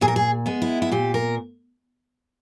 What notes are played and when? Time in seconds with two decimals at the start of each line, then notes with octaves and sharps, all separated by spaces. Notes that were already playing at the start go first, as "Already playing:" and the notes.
0.01 A#2 G#4
0.08 A#4
0.16 G#4
0.46 G#3 B3
0.62 E4
0.82 E4
0.92 A#2 G4
1.14 A#4